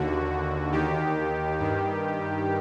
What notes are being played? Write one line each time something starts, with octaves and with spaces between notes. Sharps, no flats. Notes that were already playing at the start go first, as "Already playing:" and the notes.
Already playing: D#2 D3 F#4
D#2 D#3 G4
G2 D#3